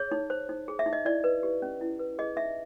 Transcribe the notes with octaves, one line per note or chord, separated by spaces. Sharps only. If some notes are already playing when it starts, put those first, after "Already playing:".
Already playing: G#4 C#5
D#4
C5
D#4
G#4
E5
D#4
D#5
E4 D5
B4
G4
C#4
E4
B4
G#4 D#5
D#4 E5